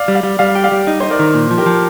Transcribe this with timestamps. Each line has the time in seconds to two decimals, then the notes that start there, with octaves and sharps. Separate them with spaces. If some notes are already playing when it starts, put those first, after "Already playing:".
Already playing: D5 F5
0.08 G3
0.15 D5 F5
0.23 G3
0.39 G3 D5 F5
0.55 G4
0.64 D5 F5
0.72 G3
0.87 D#4
1.00 D#4 C5
1.10 A#4 D5
1.19 D#3
1.34 A#2
1.51 F3
1.58 G4 A#4
1.66 F3